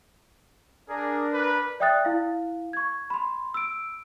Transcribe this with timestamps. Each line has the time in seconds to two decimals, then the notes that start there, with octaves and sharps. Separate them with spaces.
0.89 D4 G#4 A#4
1.33 B4
1.80 D5 E5 G5 D#6 F#6 A6
2.05 E4 F5
2.73 C#6 G#6
3.10 B5 C6
3.54 E6 D7